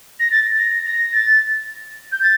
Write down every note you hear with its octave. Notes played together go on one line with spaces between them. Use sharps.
A#6
A6
A#6
A#6
A6
G6
A6